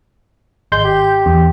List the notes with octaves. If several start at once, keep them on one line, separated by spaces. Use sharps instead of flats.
G#1 G#3 C6 G6
G4
E2